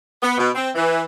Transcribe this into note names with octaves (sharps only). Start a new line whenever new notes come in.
B3
B2
C4
E3